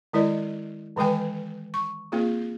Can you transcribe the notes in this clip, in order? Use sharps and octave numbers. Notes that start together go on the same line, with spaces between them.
D#3 G#3 E4 A#4 D5 D#5
D#3 E3 G#3 B4 G5 G#5
C#6
A#3 C4 F4 G#4